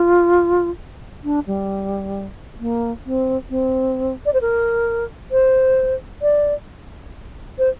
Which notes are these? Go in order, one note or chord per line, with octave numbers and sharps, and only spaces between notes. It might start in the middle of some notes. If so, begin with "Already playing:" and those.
Already playing: F4
D4
G3
A#3
C4
C4
D5
C5
A#4
C5
D5
C5